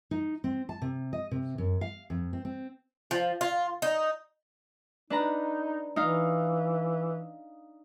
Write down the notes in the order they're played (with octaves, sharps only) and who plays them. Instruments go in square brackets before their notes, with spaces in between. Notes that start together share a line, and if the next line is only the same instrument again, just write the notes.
[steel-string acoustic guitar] D#4
C4
A5
C3
D#5
C3
F#2
F5
F2
C4
C4
[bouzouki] F3
F4
D#4
[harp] D4 B4 A#5 [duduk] D#4
[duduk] E3 [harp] D#4 F5